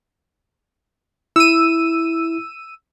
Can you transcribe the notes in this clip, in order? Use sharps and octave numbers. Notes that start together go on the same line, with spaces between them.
E4 E6 D#7